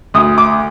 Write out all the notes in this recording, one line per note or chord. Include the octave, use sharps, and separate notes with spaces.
D2 D#6
D6